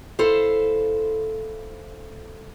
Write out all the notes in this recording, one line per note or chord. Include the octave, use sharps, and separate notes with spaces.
E4 A4 C5 F5